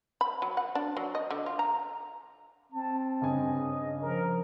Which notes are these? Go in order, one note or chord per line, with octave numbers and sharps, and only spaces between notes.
B5
F#3
F#5
D4
F#3
D#5
D3
F4
A#5
C4 A5
G2 C#3 D#5 G#5
F3 A#4